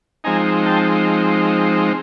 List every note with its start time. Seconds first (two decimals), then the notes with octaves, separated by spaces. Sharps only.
0.24 F3 G#3 C4 D#4 G#5 A#5
0.66 G5 A5